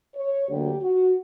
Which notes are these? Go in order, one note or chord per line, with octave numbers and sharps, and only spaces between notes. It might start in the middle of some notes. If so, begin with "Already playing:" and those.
C#5
D2 D3 F#3 A#3 G4
F#4